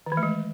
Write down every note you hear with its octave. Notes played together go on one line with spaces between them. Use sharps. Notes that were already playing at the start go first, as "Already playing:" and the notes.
D#3
E3
A3
G#3